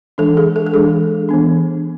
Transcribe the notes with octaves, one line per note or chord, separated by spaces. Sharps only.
E3 G#3 D4 A4
G#4
A4
A4
E3 G#3 D4 G#4
E3 B3 D4